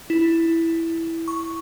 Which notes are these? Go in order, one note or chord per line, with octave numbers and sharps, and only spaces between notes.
E4
C#6